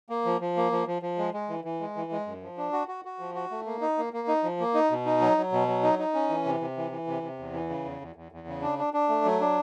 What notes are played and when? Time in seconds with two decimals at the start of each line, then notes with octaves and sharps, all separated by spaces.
0.10 A#3
0.25 F3
0.41 F3
0.57 A#3
0.72 F3
0.87 F3
1.02 F3
1.18 G#3
1.34 G#3
1.49 E3
1.64 E3
1.80 G#3
1.96 E3
2.12 G#3
2.26 F#2
2.43 F3
2.57 D4
2.73 F#4
2.88 F#4
3.05 F#4
3.19 F3
3.35 F#4
3.51 A3
3.66 A#3
3.81 D#4
3.98 A#3
4.13 A#3
4.28 D#4
4.43 F3
4.60 A#3
4.74 D#4
4.91 B2
5.05 D#4
5.21 F#3
5.37 F#3
5.52 B2
5.68 F#3
5.83 D#4
5.99 D#4
6.14 C#4
6.29 E3
6.46 C3
6.61 C3
6.77 E3
6.92 E3
7.07 C3
7.22 C3
7.39 E2
7.53 E3
7.70 C#3
7.85 E2
8.01 E2
8.16 E2
8.32 E2
8.47 C#3
8.62 D4
8.78 D4
8.94 D4
9.09 A3
9.25 F#3
9.41 D4